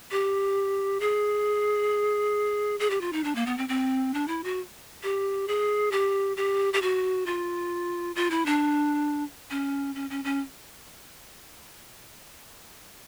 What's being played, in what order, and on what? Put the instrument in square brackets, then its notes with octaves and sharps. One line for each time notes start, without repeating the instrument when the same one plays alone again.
[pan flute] G4
G#4
G#4
G4
F4
D#4
D4
A#3
B3
C4
C4
D4
E4
F#4
G4
G#4
G4
G4
G4
F#4
F4
F4
E4
D4
C#4
C#4
C#4
C#4